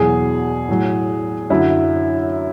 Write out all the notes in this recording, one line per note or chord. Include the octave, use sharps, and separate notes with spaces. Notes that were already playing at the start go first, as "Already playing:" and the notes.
Already playing: E2 B2 F#3 G#4
A2 F#3
F#2 D3 F#3 E4